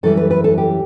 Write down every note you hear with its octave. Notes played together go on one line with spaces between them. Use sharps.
F#2 E3 G3 A4
B4
B4
A4
G4